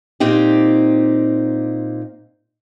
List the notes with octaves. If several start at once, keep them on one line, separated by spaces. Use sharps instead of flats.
A#2 C4 D#4 G4